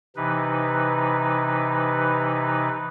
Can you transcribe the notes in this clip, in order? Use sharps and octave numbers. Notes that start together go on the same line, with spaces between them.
C3 E3 D#4 B4